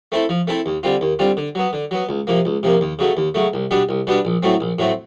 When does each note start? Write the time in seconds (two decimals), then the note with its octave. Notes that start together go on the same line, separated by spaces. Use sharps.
0.12 A3 C4 E4 A4
0.29 F3
0.47 A3 C4 E4 A4
0.66 D#2
0.83 D3 G3 C4 F4
1.01 D#2
1.19 D3 G3 C4 F4
1.37 D3
1.55 F#3 B3
1.73 D3
1.91 F#3 B3
2.09 C#2
2.27 C3 F3 A#3
2.45 C#2
2.63 C3 F3 A#3
2.81 D#2
2.99 C#3 F#3 A3
3.17 D#2
3.35 C#3 F#3 A3
3.53 C2
3.71 B2 G3 B3 D4
3.89 C2
4.07 B2 G3 B3 D4
4.25 A#1
4.43 A2 F#3 A3 C4
4.60 A#1
4.79 A2 F#3 A3 C4